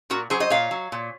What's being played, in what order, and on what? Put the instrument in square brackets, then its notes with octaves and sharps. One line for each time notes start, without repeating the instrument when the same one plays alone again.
[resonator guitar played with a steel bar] A#2 F#4 A#4
F#3 G#4 C5
C5 D#5
A#2 C#5 F5
F#3
A#2